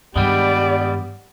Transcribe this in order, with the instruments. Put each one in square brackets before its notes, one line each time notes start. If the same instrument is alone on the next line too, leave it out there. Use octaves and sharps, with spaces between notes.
[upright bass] G2 D#3 [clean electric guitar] G3 G#3 [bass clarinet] B3 [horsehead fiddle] G4 D5